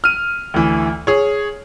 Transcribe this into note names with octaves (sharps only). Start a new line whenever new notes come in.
F6 D#7
D2 E3
G#4 C#5